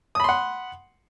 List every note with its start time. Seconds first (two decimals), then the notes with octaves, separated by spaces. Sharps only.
0.15 D#6
0.20 B5
0.24 C6
0.29 F#5